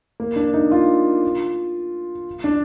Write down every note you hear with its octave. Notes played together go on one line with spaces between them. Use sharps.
A#3
D4
D#4
F4
D4